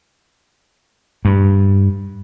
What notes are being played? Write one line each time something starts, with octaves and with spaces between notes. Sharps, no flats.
G2